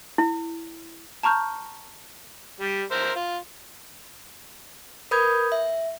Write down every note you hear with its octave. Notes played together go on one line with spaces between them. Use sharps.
E4
A5 A#5 C#6 F6 G6
G3
A#4 C5 E5
F4
A#4 B4 B5 D#6 G6 G#6
E5